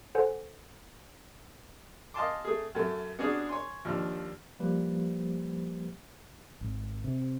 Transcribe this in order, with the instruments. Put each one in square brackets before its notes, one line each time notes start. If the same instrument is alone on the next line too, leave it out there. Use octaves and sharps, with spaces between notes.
[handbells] A4 B4 C5 F#5 G#5
[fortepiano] D#5 F5 G#5 A5 C6 D6
A3 G#4
F#2 A3
B3 C#4 D4 F#4 G#4
C#5 G#5 C6
D#2 F3 D4 F6
[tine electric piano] F3 G3 A#3 G4 B4 C5
[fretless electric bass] G#1
C3